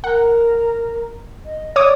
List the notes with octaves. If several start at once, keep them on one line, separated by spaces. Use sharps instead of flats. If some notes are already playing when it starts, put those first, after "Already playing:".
A#4 F#5
D#5
C#5 D5 D6 D#6